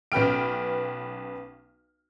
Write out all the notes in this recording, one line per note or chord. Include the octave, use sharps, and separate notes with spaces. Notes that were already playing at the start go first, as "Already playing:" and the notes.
B1 C#4 B4 G5 F6 D7